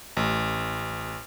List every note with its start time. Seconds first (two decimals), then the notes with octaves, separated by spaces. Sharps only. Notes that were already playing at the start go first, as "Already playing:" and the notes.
0.17 A1